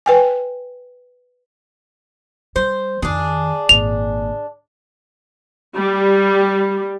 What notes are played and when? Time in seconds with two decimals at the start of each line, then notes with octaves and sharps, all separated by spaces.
0.06 B4 G5 G#5
2.56 G3 C5
3.02 F2 D#3 D4 G#4
3.69 G#1 A#2 F7
5.75 G3